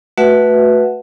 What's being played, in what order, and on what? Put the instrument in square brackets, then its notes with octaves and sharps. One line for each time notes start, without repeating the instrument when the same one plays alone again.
[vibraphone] A3 F#4 B4 E5 F#5